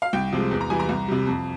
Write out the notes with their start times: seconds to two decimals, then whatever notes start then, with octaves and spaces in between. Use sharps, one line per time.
0.02 F5
0.13 C2 G5
0.32 C3 F3 G#3
0.51 E2
0.61 A#5
0.70 E3 G3 G#5
0.79 A#5
0.89 C2
1.08 C3 G3
1.27 F2